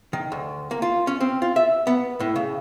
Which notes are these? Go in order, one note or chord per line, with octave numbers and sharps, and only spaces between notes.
D#3
D2
A#3
F4
C#4
C4
F4
E5
B3
A2
C#3